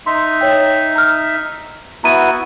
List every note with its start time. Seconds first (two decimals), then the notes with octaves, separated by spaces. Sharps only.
0.06 D#4 E5 C6
0.41 C#5 G5
0.95 A#5 F6
2.04 B3 E4 F#4 A#5 D#7